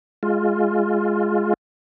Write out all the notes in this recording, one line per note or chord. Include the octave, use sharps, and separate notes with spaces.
G#3 F4